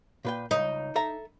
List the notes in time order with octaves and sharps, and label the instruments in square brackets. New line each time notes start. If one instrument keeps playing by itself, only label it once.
[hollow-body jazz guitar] A#2 B4 G5
[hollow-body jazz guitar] C#2 [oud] D#4
[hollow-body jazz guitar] A4 E5 A#5